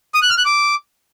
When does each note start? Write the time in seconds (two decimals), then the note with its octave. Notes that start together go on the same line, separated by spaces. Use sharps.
0.14 D#6
0.22 F#6
0.30 F6
0.38 F#6
0.45 D6